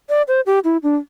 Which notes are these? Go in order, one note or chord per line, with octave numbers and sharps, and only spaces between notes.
D5
C5
G4
E4
D4